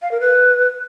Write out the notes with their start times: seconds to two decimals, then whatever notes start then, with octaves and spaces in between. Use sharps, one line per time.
0.02 F5
0.11 A#4
0.21 B4